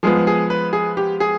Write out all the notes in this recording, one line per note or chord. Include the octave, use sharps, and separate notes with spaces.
F3 G#3 B3 G#4
G#4
B4
G#4
G4
G#4